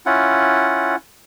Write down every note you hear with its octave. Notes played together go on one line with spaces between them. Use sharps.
C#4 E4 F4 F#5